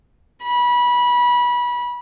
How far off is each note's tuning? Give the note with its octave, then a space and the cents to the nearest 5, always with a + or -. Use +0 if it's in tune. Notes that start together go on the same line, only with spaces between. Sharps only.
B5 -25